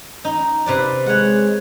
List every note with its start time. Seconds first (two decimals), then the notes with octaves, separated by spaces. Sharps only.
0.25 D#4
0.66 C3 B4 D5
1.06 G#3 C#5 F#5